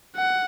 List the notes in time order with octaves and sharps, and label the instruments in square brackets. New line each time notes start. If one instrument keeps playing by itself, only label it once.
[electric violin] F#5